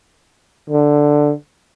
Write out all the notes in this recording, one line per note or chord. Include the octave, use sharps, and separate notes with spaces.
D3